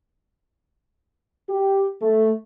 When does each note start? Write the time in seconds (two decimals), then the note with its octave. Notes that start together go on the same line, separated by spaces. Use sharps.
1.49 G4
2.02 A3